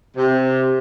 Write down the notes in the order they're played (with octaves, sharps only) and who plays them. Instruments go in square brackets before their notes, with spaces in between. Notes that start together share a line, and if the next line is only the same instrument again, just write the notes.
[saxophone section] C3